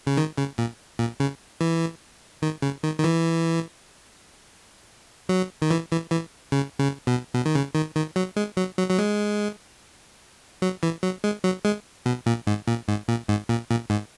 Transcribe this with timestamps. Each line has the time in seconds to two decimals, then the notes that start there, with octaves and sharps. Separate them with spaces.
0.07 C#3
0.17 D#3
0.38 C#3
0.58 A#2
0.99 A#2
1.20 C#3
1.61 E3
2.42 D#3
2.62 C#3
2.83 D#3
2.99 D#3
3.04 E3
5.29 F#3
5.62 D#3
5.71 E3
5.91 E3
6.11 E3
6.52 C#3
6.80 C#3
7.07 B2
7.34 B2
7.46 D#3
7.55 C#3
7.75 D#3
7.96 D#3
8.16 F#3
8.36 G#3
8.57 F#3
8.77 F#3
8.90 F#3
8.98 G#3
10.62 F#3
10.83 E3
11.03 F#3
11.24 G#3
11.44 F#3
11.65 G#3
12.06 B2
12.26 A#2
12.47 G#2
12.67 A#2
12.88 G#2
13.08 A#2
13.28 G#2
13.49 A#2
13.70 A#2
13.90 G#2